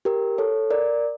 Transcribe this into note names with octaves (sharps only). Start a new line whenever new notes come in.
G4 A#4
A4 C#5
A#4 D5